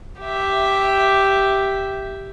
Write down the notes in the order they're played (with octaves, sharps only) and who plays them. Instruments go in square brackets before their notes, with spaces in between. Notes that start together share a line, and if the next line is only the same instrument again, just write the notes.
[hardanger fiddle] G4 E5